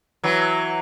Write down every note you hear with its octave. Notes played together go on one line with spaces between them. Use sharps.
E3 F#3